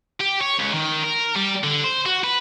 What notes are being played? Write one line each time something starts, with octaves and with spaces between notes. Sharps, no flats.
G4
C#5
C#2
D#3
A#4
G3
D3
C5
F#4
B4